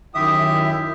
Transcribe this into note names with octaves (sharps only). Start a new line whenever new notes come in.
F#2 D#3 E4 G4 E5 D#6